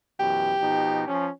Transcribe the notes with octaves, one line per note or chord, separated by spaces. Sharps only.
F#2 B2 E3 G4
B2 F3 D#4
F3 C#4